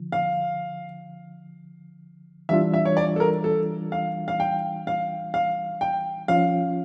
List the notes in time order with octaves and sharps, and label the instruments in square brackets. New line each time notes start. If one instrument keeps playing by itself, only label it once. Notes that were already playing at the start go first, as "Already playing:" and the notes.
Already playing: [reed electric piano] D3 F3
[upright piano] F5
[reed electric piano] E3 G3 D4 F4 [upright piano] E5
[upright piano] E5
C#5
D5
A4
A#4
A4
F5
F5
G5
F5
F5
G5
[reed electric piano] F3 C#4 F4 [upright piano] F5